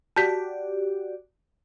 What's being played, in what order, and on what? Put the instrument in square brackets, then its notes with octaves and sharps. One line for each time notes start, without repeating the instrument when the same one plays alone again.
[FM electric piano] F#4 G4 D5 [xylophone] A5 G6 B6